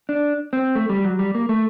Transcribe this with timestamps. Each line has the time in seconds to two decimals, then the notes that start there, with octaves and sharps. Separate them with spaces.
0.09 D4
0.53 C4
0.75 A3
0.89 G3
1.05 F#3
1.19 G3
1.35 A#3
1.49 A3